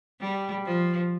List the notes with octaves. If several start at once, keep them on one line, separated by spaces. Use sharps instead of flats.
G3
F3